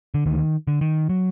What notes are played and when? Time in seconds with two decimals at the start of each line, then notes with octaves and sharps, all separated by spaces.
0.14 D3
0.26 D2 D#3
0.67 D3
0.81 D#3
1.09 F#3